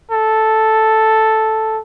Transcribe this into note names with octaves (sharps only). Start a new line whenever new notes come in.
A4